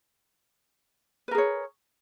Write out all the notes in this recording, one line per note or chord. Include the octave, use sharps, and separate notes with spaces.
G#4 A#4 B4 C#5